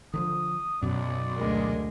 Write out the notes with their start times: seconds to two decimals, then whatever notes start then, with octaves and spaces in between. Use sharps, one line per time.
0.14 D3 E3 F3 D#6
0.82 B1 F#2 B2 F#3 D5
1.36 D2 G#3 A#4